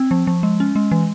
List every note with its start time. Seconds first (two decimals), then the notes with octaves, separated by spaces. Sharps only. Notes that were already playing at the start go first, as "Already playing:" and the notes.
Already playing: C4
0.11 F3
0.27 F3
0.43 G#3
0.60 C#4
0.76 G#3
0.91 E3